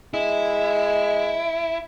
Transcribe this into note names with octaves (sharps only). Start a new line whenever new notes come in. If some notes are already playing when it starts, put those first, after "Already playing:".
G#3 E4